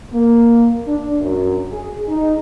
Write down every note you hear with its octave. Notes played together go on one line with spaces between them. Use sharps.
A#3
D4
F#2
G#4
D#4